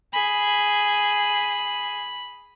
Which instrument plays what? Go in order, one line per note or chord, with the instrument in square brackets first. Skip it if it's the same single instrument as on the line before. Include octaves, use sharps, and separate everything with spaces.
[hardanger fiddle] G#4 [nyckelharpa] B5